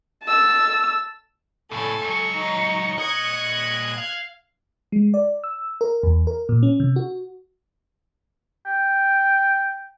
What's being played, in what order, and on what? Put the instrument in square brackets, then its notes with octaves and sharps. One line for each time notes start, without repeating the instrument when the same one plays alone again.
[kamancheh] A5 E6
[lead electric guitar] A2 C#3 [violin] A4 G#5
[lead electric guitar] C#2 F#3 [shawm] C#6
[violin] D#4
[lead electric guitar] A#2 D#5 [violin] F#6 G#6
[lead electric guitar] F5
[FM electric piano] G#3
D5
E6
A#4
E2
A#4
A#2
C#4
C3
F#4
[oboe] G5